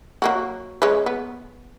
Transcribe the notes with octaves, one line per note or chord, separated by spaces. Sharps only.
F#3 A#3 F#4
G#3 C#4 B4
B3